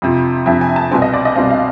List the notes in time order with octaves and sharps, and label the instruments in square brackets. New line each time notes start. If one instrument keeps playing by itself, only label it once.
[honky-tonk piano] F2 C3 F3
F2 C3 F3 E5
G#5
A5
C2 B2 G3 C4 G#5
D#5
D5
D#5
C2 B2 G3 C4 F5
F5